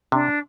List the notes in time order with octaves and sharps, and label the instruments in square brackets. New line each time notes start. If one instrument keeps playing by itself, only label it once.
[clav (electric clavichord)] C3 [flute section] D4